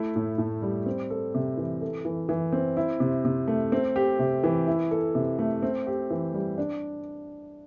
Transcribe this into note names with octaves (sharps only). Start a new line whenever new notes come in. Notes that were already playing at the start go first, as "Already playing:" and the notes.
Already playing: A3 E4
A2
A2
G3
C4
A4
C3
E3
A4
E3
E3
C4
E4
C3
C3
A3
C4
G4
C3
E3
E4
A4
C3
A3
C4
G4
E3
G3
D4